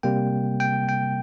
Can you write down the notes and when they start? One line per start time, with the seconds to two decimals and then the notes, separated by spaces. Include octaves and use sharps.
0.03 C3 G3 A#3 G5
0.60 G5
0.89 G5